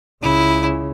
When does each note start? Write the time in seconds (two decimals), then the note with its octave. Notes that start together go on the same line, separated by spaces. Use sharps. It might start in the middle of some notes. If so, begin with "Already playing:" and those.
0.23 C#2 C#3 E4